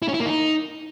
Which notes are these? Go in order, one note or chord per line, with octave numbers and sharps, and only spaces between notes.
E4
C#4
E4
A#3
D#4